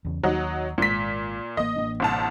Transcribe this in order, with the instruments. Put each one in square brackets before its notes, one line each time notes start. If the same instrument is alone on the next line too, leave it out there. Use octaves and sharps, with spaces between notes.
[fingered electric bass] E2 C#3
[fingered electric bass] D#2 D#3 [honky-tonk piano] F#3 D#4 F#5
[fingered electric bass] G#1 G#3 [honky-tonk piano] A#2 B6
[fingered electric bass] A1 A#3 [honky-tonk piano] D#5
[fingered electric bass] A1 A#3 D4
[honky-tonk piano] G1 C2 A5